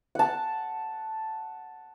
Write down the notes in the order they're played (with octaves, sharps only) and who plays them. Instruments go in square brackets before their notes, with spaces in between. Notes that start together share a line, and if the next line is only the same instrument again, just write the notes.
[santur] F#5 A5